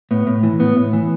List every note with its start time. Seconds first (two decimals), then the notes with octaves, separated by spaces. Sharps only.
0.11 A2 B3
0.27 A2
0.43 E3
0.60 A2 B3
0.77 A2
0.93 E3